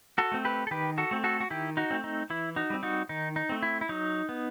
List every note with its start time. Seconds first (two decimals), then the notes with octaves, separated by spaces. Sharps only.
0.18 F#4 A4
0.32 A3 C4
0.45 G4 B4
0.67 A4
0.71 D#3 G4 B4
0.98 F#4 A4
1.11 A3 C4
1.24 F#4 A4
1.40 F#4
1.50 D#3 E4 G4
1.77 D#4 F#4
1.91 A3 C4
2.04 D#4
2.30 E3 E4
2.56 D#4 F#4
2.70 G3 C4
2.83 D#4 F#4
3.09 D#3 D#4
3.36 D#4
3.49 A3 C4
3.63 E4
3.81 E4
3.89 F#3 D#4
4.29 B3